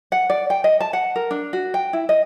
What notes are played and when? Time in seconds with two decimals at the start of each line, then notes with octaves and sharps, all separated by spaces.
0.12 F#5
0.30 D5
0.50 G5
0.64 D#5
0.80 A5
0.93 F#5
1.16 A#4
1.31 D4
1.53 F#4
1.74 G5
1.93 E4
2.09 D#5